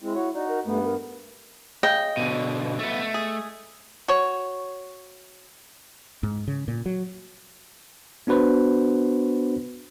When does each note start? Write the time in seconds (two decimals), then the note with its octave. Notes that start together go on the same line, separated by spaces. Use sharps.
0.01 G#3 C4 E4
0.15 F#4 C#5
0.35 D#4 F#4 D5
0.48 A#4
0.65 G2 A3 B3
0.85 A#4
1.83 C#3 D#5 G5
2.17 B2 D3
2.79 A3 B3
3.00 A3
3.14 G#4
4.08 F#4 C#5
6.23 G#2
6.48 C#3
6.68 A#2
6.86 F#3
8.27 B3 D4 F#4 B4 C5